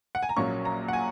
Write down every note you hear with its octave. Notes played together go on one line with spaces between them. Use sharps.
F#5
G#5
A#5
A#1 A#2 F#3 A#3 C#4 C#6
A#5
F#5
G#5